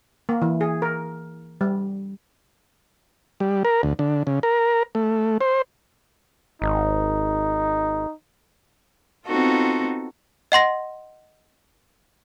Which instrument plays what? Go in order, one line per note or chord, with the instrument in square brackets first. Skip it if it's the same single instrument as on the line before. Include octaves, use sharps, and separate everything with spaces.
[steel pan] A#3
E3
G#4
A#4
G3
[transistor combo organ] G3
A#4
D2
D3
C#3
A#4
A3
C5
[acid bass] G#1 [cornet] D#4
[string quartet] B3 C4 D#4 F4 F#4 A4
[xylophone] D#5 F#5 C6 A#6